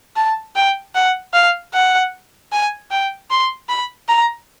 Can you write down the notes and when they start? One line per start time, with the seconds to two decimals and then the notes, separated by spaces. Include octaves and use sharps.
0.16 A5
0.56 G5
0.95 F#5
1.33 F5
1.74 F#5
2.52 G#5
2.91 G5
3.30 C6
3.69 B5
4.08 A#5